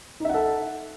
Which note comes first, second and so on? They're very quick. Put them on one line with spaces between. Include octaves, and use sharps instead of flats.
D#4 E5 F#5 A4